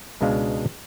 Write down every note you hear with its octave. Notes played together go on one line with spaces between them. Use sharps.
C#2 B2 G#3 D4 F5